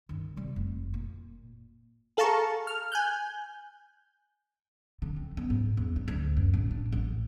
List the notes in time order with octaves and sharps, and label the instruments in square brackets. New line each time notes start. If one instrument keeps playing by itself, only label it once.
[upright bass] G2 D#3
C3 G3
F1
A#2
[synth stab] G#4 A4 F5 A5 A#5 C#6
F6
G#5 F#6 G6
[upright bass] D3
C4
B3
G#2
E2
D4
D2
F#2
A1
D4
A1